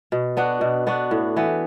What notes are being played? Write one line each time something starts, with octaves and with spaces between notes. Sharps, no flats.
B2
B3 D4 F#4
B2
B3 D4 F#4
A2
E3 B3